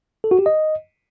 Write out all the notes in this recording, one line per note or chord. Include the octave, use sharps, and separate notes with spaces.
A4
F#4
G4
D#5